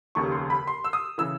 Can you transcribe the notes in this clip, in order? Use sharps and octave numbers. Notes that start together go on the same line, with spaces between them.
F1 D#2 C#3 C#6
C6
B5
C6
E6
D#6
C#3 E3 E6